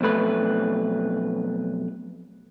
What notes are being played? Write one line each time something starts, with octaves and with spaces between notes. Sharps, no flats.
B1 F2 A3 B4